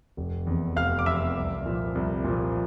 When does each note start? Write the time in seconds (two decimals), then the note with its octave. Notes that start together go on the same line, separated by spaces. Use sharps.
0.17 F1
0.47 E2 C3
0.76 F1 F5 F6
0.99 D6
1.06 E2 C3 E5 E6
1.36 C2
1.66 A#2 F3
1.95 C2
2.24 A#2 F3